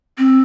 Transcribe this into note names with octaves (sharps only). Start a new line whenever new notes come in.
C4